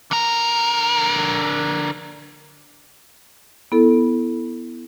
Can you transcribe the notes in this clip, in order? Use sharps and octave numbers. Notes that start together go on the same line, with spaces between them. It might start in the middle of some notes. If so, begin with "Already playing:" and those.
D3 A#4
B3 E4 A4